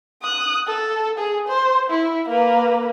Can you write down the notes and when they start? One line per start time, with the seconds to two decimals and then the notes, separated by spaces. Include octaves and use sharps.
0.22 D#6 F#6
0.67 A4
1.18 G#4
1.48 C5
1.90 E4
2.29 A#3 B4